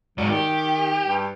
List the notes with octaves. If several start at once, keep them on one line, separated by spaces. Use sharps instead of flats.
G#2 F#3 D5
D#3 G4
G2